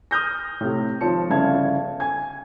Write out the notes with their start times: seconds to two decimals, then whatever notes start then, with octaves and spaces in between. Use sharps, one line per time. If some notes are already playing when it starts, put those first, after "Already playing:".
0.11 D#6 F6 G6 A#6
0.61 A2 C3
1.01 G#1 F3 C#5 A5 C#7
1.30 G1 C#3 E4 F5 A5 G#6
2.00 G#5 G#6